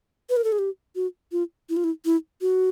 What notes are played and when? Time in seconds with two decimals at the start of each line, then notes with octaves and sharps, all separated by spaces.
0.30 B4
0.37 A#4
0.44 A4
0.52 G#4
0.59 G4
0.95 F#4
1.32 F4
1.69 E4
1.77 F4
1.84 E4
2.05 E4
2.41 F#4